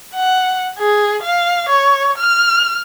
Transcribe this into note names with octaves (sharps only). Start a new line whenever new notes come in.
F#5
G#4
F5
C#5
F6